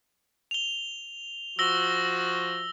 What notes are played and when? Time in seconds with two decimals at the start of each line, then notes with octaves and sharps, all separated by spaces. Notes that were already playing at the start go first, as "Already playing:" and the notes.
0.51 F7 G7
1.59 F3 F#4 E6 A#6 G7